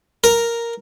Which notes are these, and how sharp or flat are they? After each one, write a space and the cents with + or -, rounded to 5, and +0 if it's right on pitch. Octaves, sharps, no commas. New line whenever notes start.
A#4 +0